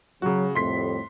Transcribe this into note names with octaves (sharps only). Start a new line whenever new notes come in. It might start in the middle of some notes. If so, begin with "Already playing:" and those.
C#3 F#3 F#4
C2 F2 A2 C6 B6